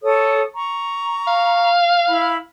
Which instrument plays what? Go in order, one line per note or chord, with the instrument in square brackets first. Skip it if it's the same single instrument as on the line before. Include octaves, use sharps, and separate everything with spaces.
[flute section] A4 C#5 D#6
A#5 C#6
[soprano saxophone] F5
[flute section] E4 B5